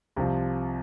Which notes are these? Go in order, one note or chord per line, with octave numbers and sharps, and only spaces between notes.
C2 C3 F3